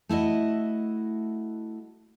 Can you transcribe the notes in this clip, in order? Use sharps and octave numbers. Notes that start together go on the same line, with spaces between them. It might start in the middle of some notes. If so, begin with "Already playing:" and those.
A3 E4 F#4 D#5